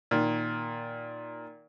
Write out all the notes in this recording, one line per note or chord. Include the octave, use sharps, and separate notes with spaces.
A#2 D#3